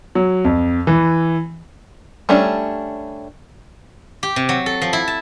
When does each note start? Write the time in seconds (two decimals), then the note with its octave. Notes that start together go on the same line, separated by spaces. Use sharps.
0.15 F#3
0.45 F2
0.87 E3
2.29 G3 A3 C#4 D4
4.23 G4
4.36 C3
4.49 F#3
4.66 A4
4.82 F3
4.93 E4
5.08 A5